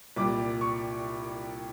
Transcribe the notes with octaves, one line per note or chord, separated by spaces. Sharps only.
C2 A#2 G3 D6
C#6